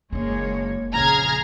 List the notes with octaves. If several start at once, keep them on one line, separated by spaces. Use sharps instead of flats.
F#1 G#3 A#3 D4 C#5
A#1 F2 C#3 G#4 A#5 F6 G#6